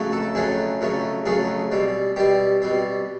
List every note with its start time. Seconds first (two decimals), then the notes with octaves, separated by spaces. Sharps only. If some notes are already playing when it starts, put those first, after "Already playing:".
Already playing: F2 C#3 F#3 A3
0.12 A4
0.35 F2 C#3 F#3 A3 G#4
0.81 F2 C#3 F#3 A3
1.26 F2 C#3 F#3 A3 G#4
1.72 B2 G3 C4
2.16 B2 G3 C4 G4
2.62 B2 G3 C4